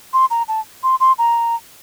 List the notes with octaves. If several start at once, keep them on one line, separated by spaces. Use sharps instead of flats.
C6
A#5
A5
C6
C6
A#5